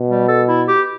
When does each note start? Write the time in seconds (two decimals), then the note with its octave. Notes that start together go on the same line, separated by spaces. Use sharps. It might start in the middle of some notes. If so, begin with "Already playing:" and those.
Already playing: B2
0.09 G3
0.28 A4
0.48 E4
0.68 G4